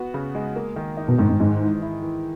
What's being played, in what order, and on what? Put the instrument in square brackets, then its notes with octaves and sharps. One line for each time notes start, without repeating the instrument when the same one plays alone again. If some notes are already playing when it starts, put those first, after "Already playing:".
Already playing: [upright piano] B3 F#4
C#3
G#3
A#3
D#3
D#4
[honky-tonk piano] B2
[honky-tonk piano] G#2 [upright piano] D#3
[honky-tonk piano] G#2
[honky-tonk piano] G#2 [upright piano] G#3
[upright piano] E3
E4
E3